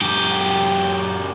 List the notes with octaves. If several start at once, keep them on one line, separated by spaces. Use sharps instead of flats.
F#2 G4